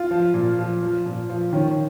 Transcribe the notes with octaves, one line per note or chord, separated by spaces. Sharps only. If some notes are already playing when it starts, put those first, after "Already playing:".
Already playing: F4
F3
A#2
F3
F3
A#2
F3
D#3 C#4